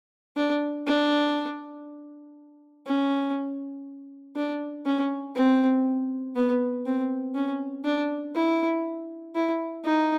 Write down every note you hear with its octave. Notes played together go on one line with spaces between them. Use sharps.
D4
D4
C#4
D4
C#4
C4
B3
C4
C#4
D4
E4
E4
D#4